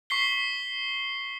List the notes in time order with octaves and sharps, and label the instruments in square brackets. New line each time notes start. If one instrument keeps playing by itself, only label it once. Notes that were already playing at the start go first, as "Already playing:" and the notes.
[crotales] C#6 B6 C7 G7